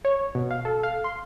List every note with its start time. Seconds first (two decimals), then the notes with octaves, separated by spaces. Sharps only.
0.05 C#5
0.35 B2
0.51 F5
0.65 A4
0.83 F5
1.04 C6